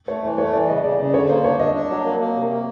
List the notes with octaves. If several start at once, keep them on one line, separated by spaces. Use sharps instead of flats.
A3 C#5
E3 C5
A3 C#5
E3 D5
C#3 D#5
C#3 D5
C#3 D5
D3 C#5
A#3 C5
D4 C#5
D4 D#5
D4
F#3
A#3
A#3
C3
A#3